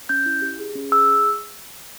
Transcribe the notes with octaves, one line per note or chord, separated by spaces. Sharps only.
C#4 G6
E4
G4
G#4
C#4
G#4 E6